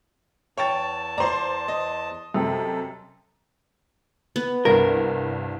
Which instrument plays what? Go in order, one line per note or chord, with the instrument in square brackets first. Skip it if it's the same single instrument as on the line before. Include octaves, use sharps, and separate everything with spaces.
[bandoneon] E2 A5 [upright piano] C#5 G5 A6
[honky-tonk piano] C5 D5 [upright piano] A#5 C6
[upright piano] D#5
[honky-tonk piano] F#2 C3 [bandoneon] A4
[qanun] B3
[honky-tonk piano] C2 G2 [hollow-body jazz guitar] A#4